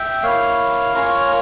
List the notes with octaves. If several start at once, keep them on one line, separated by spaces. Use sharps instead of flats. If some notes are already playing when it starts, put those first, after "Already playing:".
Already playing: E5 G5
A#3 E4 C#5 F5
A#3 C#4 F4 A#4 C#5